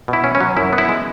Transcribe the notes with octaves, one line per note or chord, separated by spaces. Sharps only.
B2
E4
C#4
C#4
F#3
F#2 E4
B3
E4
G#3